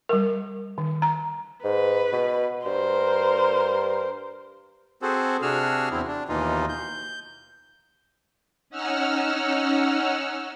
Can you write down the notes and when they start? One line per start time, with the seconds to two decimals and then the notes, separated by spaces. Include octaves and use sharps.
0.09 G3 A#4
0.78 D#3
1.02 A#5
1.64 G#2 B4
2.13 B2
2.66 G2 A#4 C5
5.02 C4 F#4 G#4 A4 C5
5.42 C3 D4 F#4 G#4 E6 F6
5.91 E2 C4 E4
6.07 D4
6.29 D#2 B2 E3 D#4 F4
6.69 G6
8.70 C#4 D#4 F#5 E6 F6